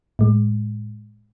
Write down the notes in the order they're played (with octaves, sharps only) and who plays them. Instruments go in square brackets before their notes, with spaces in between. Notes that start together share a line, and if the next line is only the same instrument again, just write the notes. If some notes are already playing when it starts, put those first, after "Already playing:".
[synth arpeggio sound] A2 G#3